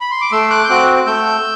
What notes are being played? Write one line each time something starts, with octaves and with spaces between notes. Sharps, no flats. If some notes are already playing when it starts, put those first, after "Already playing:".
B5
C6
D6
A3 C6 E6
D6 F#6
G6
C4 F#4 D6 F#6
A3 E6 G6